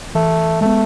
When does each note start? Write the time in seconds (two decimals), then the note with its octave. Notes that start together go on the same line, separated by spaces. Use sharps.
0.15 E3 A3
0.61 G#3 A3 B3